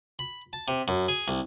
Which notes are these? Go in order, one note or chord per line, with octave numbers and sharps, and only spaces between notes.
B5
A5
C3
F#2
G#4
C2